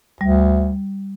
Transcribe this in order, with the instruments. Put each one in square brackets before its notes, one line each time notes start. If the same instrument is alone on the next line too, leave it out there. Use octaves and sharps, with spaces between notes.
[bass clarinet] D2 [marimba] G3